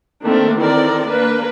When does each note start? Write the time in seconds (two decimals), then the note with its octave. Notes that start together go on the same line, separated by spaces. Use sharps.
0.24 D#3 A3 A#3 C4 D4
0.57 D#3 E3 C4 A4 A#4 D5
1.07 A#3 D4 A#4 B4